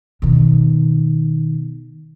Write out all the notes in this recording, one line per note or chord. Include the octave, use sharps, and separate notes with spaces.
B2 D#3